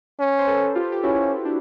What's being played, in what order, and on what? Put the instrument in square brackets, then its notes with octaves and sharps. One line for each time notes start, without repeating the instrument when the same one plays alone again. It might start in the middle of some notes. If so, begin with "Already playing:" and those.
[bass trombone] C#4
[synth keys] C5
A4 B4
F4 G4
G4
[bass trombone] C#4 [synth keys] E4 F#4
[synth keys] D4